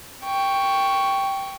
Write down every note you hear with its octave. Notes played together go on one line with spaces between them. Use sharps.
G5 C#6